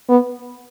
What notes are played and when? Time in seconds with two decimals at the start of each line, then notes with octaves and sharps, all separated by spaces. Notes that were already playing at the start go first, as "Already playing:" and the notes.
0.09 B3